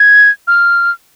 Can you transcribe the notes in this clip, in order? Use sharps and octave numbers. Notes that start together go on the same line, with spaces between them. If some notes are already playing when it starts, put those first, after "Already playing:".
Already playing: G#6
F6